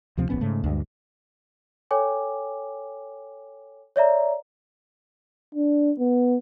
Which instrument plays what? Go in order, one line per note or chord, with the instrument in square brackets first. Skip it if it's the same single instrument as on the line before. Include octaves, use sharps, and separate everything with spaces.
[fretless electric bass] D2 C3 F3 C4
D1 A#1 B3 C#4
G#2 C#3 A3
D2 G2 G#3
[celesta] A4 C#5 G5 G#5 D6
C#5 D5 E5 A#5
[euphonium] D4
B3